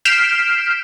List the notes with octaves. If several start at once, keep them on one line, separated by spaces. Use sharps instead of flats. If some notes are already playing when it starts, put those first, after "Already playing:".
F6 G6 B6 C7 D7 E7